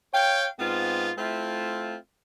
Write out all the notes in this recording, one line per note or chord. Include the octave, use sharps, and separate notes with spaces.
C#5 F5 G5
G#2 B3 C4 F4
A3 C4 E4 F4